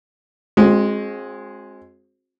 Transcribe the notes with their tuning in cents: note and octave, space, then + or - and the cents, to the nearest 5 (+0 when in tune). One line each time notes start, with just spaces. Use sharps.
G#3 +0 C4 +30 F#4 -35